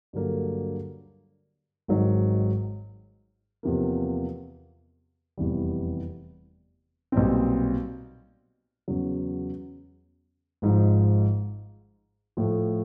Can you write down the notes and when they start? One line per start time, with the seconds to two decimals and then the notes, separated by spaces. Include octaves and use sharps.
0.13 G2 D3 F#3 A#3
1.88 G#1 G#2 D#3 F#3
3.63 E2 C3 F3 A#3
5.38 F1 E2 C3 E3 G3
7.12 B1 A#2 G3 C4
8.88 E2 C#3 F#3
10.62 G#1 G#2 F3
12.37 A2 F3 A3